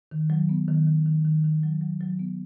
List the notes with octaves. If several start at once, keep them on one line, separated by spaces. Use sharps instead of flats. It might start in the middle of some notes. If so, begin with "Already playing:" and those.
D#3
F#3
B3
D#3
D#3
D#3
D#3
D#3
F#3
F#3
F#3
B3